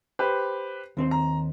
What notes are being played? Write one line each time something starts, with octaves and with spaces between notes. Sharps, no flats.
G4 B4 C5
D#2 C4 C5
A#5